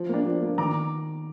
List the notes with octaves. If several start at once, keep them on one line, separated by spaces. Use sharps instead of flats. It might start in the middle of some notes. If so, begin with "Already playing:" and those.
Already playing: F3
A#3 D4
F3
A#3 D4
D#3 A#5 D6